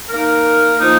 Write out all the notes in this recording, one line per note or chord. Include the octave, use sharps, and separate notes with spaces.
A#3 D#4 A#4
F3 A#3 D#4